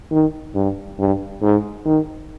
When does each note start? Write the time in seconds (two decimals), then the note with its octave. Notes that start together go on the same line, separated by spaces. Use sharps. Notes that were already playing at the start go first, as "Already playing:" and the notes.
0.12 D#3
0.55 G2
0.99 G2
1.42 G#2
1.85 D#3